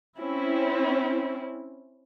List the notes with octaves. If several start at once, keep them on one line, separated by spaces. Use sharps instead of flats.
C4 C#4 E4